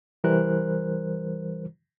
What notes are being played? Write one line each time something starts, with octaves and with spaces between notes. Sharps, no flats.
C2 E3 G3 A#4 C5 F#6